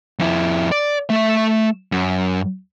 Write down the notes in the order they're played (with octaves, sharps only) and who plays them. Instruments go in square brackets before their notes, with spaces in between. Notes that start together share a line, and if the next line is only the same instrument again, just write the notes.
[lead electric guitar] F2 E4
D5
A3 E5
F#2